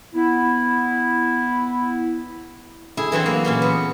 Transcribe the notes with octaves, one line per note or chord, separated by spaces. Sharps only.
B3 E4
D3 E4 G#4
E3 F#3 C4 B5
A#3
A#2 C#3 E3
B3